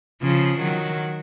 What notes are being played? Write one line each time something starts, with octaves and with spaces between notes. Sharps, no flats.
C#3 F3
D#3 F#3